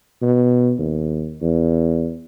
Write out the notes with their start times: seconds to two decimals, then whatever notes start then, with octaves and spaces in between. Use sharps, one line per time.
0.22 B2
0.79 D#2
1.42 E2